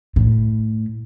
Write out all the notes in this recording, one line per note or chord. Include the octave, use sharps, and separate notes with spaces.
A2